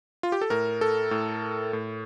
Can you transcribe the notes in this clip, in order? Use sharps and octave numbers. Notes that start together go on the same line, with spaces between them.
F4
G4
A4
A2 A#4
A4
A2
A2